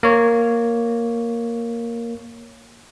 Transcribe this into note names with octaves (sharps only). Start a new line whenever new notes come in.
A#3 C#5